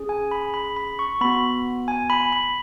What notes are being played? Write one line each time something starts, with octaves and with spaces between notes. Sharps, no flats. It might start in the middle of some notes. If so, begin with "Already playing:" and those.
Already playing: C#4 G#4
G#5
B5
B5
B5
C#6
B3 F#4 B5
G#5
B5
B5